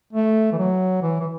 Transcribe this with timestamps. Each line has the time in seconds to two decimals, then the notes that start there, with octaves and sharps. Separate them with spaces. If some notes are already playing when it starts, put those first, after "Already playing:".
0.13 A3
0.52 E3
0.57 F#3
1.02 E3
1.20 E3